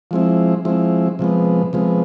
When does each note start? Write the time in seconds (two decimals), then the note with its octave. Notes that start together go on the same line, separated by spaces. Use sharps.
0.11 F3 G#3 C4 E4
0.65 F3 G#3 C4 E4
1.19 C3 F3 G#3 B3
1.73 C3 F3 G#3 B3